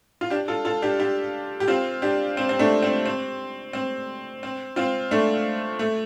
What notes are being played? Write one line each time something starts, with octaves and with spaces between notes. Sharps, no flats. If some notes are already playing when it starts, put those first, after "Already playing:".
F4
D4 G4
F4 A4
F4 A4
D4 G4
D4 G4
G4
C4 F4
D4 G4
C4
C4
A3 D4
C4
C4
C4
C4
C4 F4
A3 D4
A3